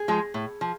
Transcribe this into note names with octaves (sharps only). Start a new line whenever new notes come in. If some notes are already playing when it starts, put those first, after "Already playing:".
Already playing: G#4
F3 G#3
A2
F3